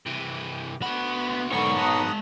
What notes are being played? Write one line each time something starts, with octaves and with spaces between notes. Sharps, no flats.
C3 E3
B3 D4 F#4 B5
G#2 D3 D#3 F#3 B3 C#5 C#6
G#3 F#5 A5 A#5 D#6